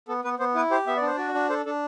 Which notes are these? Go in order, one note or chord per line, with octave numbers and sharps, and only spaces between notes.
B3 A4
B3 B4
B3 C5
E4 B4
G4 C5
B3 E5
D5
D4 C5
F#4 D5
D4
A4 C5
D4 A4